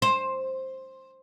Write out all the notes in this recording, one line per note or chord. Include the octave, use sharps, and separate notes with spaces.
C5